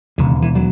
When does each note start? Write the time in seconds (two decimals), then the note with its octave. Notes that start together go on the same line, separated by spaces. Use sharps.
0.18 E1 D#2 C#3
0.42 E3
0.55 F#3